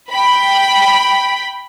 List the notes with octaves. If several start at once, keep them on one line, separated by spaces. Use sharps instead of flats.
G5 B5